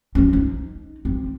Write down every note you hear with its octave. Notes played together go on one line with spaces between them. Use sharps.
F3 C#4
D#4
C4